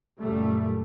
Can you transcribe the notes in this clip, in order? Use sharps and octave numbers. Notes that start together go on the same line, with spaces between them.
F#1 A#2 G3 A3